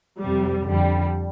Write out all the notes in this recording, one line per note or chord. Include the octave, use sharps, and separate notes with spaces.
F2 C3 G3
F2 D3 G3